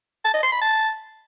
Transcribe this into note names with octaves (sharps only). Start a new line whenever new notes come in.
A5
D#5
C6
B5
A5